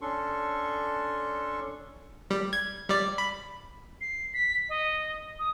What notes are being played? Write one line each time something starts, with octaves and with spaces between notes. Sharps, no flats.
C#4 D4 A4 C6 C#6
G3
G#6
G3 D5
B5
C7
B6
D#5
D#6